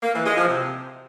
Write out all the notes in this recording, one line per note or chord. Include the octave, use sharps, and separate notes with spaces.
A#3
E3
G#3
F3
C3